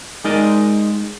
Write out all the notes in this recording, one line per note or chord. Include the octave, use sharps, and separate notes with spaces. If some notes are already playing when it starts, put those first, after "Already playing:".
G#3 D#4 A#4 D5 D#5